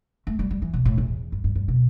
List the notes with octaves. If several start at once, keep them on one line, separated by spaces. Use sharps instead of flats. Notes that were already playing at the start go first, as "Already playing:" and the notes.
A3
G3
G3
E3
B2
A2
E2
G2
G2
G2
B2